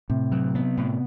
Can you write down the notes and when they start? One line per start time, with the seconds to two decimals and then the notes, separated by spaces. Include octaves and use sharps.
0.10 A2 C3
0.32 F#3
0.55 B3
0.77 A2